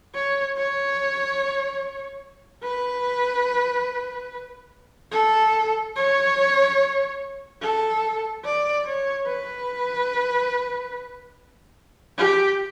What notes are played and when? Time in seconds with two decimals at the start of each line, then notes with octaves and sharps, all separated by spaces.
0.15 C#5
0.57 C#5
2.63 B4
5.12 A4
5.96 C#5
7.62 A4
8.44 D5
8.85 C#5
9.27 B4
12.18 G4